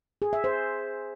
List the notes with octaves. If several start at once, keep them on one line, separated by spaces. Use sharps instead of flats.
G#4
E5
C5